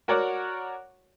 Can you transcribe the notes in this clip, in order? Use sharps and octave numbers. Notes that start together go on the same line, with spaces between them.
F#4 A#4 C#5 D5 F#5